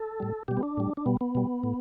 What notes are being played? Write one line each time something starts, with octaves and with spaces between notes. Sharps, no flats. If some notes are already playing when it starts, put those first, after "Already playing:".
Already playing: A4
A2 G3
B2 G3 G4
B3
D4
A2 G3
D4
B2 G3 B3
B3
B2 G3
A2